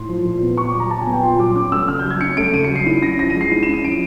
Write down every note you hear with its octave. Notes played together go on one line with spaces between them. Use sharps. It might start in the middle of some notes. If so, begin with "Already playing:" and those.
Already playing: A2 C6
F3
A#2
B3
A#2 C#6
F#3 D6
A#5
A#2 A5
G#5
B3
G5
A#2 C6
F#3 D6
C#4 D6
A3 E6
C#3 F6
G6
F#3
G#6
C#4 C#7
A3 D7
C#3 D#7
C#7
F#3
C7
E4 D#7
C#4 A#6
F3 A#6
D#7
G#3
C7
E4 D#7
E7
C#4
D#7
F3 D7